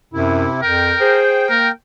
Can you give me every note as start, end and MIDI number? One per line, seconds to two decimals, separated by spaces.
0.14 0.47 42
0.14 0.61 48
0.14 0.61 64
0.62 0.94 41
0.62 1.19 70
0.62 1.72 79
1.01 1.48 68
1.01 1.55 72
1.50 1.70 58
1.50 1.70 70